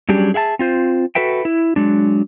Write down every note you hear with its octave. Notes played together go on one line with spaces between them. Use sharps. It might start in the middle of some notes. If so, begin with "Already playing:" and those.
F#3 G3 C#4 D4 G4 G#4
G#4 E5 F#5 A5
C4 F4 C5
F#4 A4 B4 E5 G5
E4
F#3 G#3 D4